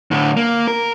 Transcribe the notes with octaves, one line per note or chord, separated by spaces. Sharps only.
A2 D3
A#3
A#4